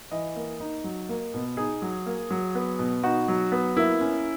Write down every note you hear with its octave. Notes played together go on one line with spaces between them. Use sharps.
E3 D#5
A#3
D#4
F#3
A#3
B2
D#4 G#4
F#3
A#3
F#3
B3
B2
D#4 F#4
F#3
B3
A#3 E4
C#4